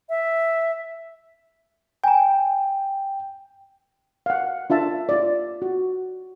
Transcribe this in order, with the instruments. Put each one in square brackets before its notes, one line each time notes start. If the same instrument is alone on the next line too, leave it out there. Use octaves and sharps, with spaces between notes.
[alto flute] E5
[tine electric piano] G5 [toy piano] G#5 A#5
[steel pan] F5 F#5
D4 F4 E5 A5
F4 D5
F#4